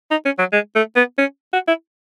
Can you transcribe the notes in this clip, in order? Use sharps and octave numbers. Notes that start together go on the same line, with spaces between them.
D#4
C#4
F#3
G#3
A3
B3
C#4
F#4
E4